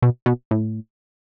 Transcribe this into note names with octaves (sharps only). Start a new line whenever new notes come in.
B2
B2
A2